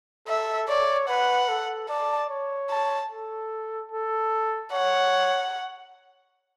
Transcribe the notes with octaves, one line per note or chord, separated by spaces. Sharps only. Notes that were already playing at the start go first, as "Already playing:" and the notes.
A4 E5
C#5 D5
B4 F#5
A4
D5 A5
C#5
A5
A4
A4
C#5 F#5